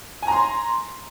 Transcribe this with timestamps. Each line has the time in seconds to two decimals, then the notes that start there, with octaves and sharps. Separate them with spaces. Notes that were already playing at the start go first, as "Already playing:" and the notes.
0.22 G#5
0.27 A#5
0.32 C6